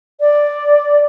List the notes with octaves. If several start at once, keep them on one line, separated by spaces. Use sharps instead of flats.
D5